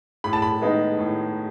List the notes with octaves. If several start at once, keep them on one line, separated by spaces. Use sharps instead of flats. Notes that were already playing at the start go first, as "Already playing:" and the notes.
A2 B5
A5
B5
G#3 B3 D#4
A2